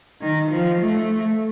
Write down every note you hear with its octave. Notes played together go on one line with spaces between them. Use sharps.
D#3
F3
A3